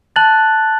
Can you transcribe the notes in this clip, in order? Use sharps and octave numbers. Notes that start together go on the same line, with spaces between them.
A5 F#6 A6 F#7